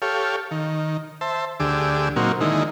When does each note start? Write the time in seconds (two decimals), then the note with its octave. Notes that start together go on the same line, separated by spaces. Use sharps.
0.02 G4 A4 C#5 F5
0.51 D#3
1.21 C5 E5 A5
1.60 D2 D3 G4 G#4 D6 E6
2.16 A#2 F#3 A#3 C4 D#4 F#4
2.41 D3 D#3 G#3 A#3 D#4 E4